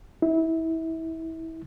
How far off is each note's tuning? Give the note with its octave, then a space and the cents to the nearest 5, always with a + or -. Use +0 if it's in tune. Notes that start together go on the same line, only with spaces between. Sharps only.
E4 -25